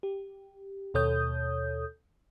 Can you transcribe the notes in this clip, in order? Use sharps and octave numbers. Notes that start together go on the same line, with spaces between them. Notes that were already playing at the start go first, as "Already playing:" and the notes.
G4
D#2 B2 A4 C#5 D#6 G6